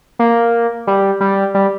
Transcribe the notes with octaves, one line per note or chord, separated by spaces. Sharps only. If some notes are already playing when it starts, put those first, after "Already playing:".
A#3
G3
G3
G3